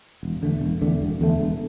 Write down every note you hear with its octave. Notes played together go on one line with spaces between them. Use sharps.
E1
E2 D3 A3
E1
E2 D3 A3
E1
E2 D3 A3
E1